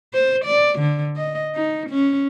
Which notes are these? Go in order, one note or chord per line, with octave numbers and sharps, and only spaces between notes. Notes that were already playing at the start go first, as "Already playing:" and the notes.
C5
D5
D3
D#5
D#4
C#4